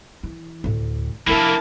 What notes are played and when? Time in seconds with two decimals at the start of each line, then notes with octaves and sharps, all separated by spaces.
0.23 E3
0.64 D2 A2
1.27 C3 F3 A#3 D4 E4 A#4 A5